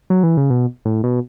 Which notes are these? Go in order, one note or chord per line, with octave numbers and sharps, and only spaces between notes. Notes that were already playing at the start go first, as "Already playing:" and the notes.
F#3
E3
C#3
B2
A2
B2